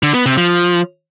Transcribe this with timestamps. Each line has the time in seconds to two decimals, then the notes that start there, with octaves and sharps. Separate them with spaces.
0.03 D3
0.14 B3
0.26 C3
0.37 F3